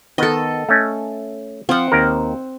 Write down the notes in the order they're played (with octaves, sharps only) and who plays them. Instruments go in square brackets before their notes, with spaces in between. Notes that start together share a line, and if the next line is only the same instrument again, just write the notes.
[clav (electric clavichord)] D#3 B3 [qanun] A4 D#5
[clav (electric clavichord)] A3 C#4
[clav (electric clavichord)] F3 F4 [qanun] C4 F#5
[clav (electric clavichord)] D#2 A#4